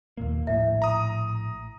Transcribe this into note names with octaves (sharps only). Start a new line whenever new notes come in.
D#2 A#2 A#3
A#1 A2 E5
A#5 D#6